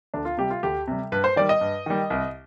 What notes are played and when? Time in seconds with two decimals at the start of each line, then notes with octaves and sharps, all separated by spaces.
0.14 D2 D4
0.25 F4
0.37 C3 G3 G4
0.50 F4
0.63 D2 G4
0.88 C3 G3
1.12 G2 B4
1.24 C5
1.36 D#3 G3 D5
1.49 D#5
1.61 G2
1.86 D#3 G3
2.10 C2